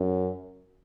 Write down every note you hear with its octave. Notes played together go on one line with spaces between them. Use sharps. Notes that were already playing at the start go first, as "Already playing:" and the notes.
Already playing: F#2